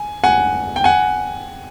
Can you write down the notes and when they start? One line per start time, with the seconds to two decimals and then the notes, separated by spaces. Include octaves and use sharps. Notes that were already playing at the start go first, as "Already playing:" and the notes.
Already playing: G#5
0.24 F#5 G#5
0.76 G5
0.84 F#5 G#5